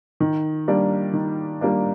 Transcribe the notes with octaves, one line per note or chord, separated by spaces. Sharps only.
D#3
G3 A#3 D4
D#3
G3 A#3 D4